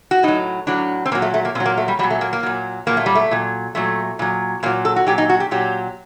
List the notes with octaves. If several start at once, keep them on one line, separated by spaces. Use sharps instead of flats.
F#4
A2 F#3 D#4
A2 F#3 D4
C4
A#2 F#3 A#3
A3
A3
A#3
A#2 C4
F#3
A#3
A3
G3
A#2 F#3 G3
A3
A#3
A#3
A#2 F#3
A#2 F#3 A#3
A3
G3
A3
A#2 F#3
A#2 F#3 A3
A#2 F#3
A#2 F#3 A#3
A4
F#4
A#2 F#3 G4
D#4
F#4
G4
A#2 F#3 G4